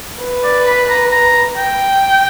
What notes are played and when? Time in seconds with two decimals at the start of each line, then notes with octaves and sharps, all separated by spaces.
0.21 B4
0.44 D5
0.67 B5
0.89 A#5
1.12 A#5
1.57 G5